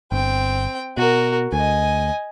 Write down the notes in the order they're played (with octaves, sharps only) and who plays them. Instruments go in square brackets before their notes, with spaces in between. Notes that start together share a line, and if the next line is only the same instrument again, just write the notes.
[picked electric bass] G1 [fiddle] C4 G5
[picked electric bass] B2 [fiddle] F#4 A#4
[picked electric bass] D2 [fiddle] D#5 G#5